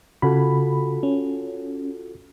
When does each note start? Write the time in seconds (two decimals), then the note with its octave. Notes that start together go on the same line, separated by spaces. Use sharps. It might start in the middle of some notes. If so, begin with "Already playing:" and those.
0.22 C#3 F4 F#4 A4 B5
1.03 C#4